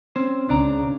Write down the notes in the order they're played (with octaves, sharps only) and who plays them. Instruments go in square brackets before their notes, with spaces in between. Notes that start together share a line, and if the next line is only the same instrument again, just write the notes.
[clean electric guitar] C4 C#4 C5
[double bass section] C#2 C#3 [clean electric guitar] D4 D5 A#5